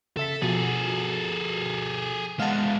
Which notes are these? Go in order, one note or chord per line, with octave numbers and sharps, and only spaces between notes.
C#3 A4 E5 B6
B2 F3 F#4 G#4 A4
G#3 B3 F5 F#5 A5